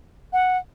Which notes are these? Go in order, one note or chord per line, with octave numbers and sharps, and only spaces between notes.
F#5